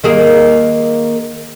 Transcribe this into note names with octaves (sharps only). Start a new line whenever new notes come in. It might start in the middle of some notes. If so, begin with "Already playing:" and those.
D#3 A#3 G#4